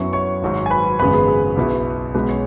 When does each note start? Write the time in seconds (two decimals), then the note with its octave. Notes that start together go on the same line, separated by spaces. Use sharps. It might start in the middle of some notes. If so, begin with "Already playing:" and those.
Already playing: F#2 F#3 B3 E4 C#5 C#6
0.13 C#5 C#6
0.42 G#1 G#2 F#3
0.66 G#5
0.70 B4 B5
0.99 G#1 F#2 C#3 G#3 B3 B4 B5
1.14 G#4
1.28 G#4
1.57 B1 B2 B3 E4
2.15 B1 B2 G#3 B3 B4
2.29 C#4 C#5